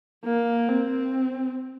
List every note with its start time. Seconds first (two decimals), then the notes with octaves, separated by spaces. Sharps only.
0.25 A#3
0.69 C4